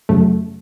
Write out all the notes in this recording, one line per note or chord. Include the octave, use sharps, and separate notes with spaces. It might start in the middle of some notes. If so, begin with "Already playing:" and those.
F#2 C#3 F#3 A3